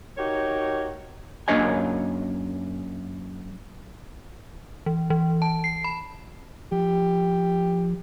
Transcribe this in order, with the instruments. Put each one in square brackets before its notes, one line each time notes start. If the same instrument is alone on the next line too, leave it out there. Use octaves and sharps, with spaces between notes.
[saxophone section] D#4 F#4 G4 A#4 C#5
[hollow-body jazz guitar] F#2 A#3 D4 C#5 D#5 G#5
[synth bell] E3
E3
A5
C7
B5
[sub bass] F3 [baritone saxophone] G4